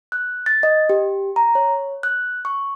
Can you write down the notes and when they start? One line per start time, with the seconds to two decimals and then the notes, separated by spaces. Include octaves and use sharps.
0.12 F#6
0.46 A6
0.63 D#5
0.89 G4
1.36 A#5
1.55 C#5
2.03 F#6
2.45 C#6